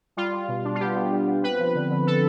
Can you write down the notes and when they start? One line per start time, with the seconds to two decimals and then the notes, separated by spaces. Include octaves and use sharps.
0.17 G3 F4
0.33 G3
0.48 B2
0.64 D4
0.75 F4
0.80 B3 G4
0.95 B3
1.12 G3
1.27 B3
1.44 C4 B4
1.59 F3
1.75 D3
1.90 D3
2.06 D3 A4